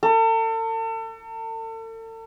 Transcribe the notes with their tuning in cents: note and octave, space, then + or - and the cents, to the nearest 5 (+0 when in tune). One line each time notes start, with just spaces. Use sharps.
A4 +40